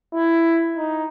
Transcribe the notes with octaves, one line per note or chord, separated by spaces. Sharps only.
E4
D#4